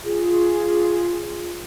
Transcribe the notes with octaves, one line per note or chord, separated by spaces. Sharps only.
F4 G#4